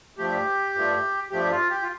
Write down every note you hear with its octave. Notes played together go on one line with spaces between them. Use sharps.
G2 F3 A3 G4
G2 F3 A3
G2 F3 A3 G4
F4
G4
F4